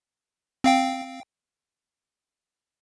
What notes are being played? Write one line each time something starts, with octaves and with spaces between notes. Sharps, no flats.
C4 F5 G5